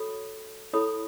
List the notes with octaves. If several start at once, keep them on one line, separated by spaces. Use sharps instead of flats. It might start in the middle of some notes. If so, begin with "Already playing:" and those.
Already playing: F#4 A4 C#5 B5 D#6
E4 A4 C#5 B5 D#6